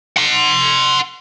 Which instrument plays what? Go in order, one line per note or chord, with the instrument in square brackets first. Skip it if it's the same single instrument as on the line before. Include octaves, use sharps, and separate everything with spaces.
[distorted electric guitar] F#5 C6